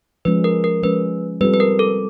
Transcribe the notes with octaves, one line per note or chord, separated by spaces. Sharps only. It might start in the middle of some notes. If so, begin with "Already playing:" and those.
F3 G#3 C#4 B4
A#4
A#4
F3 G#3 C#4 B4
G3 C4 F4 A4 B4
B4
A#4
A4